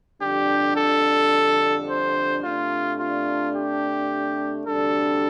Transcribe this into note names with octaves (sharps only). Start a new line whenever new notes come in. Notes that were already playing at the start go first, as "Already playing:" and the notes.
F2 D3 G3 D4 G4
A4
C5
C3 A3 D4 F4
F4
G4
D2 C3 G3 D4 A4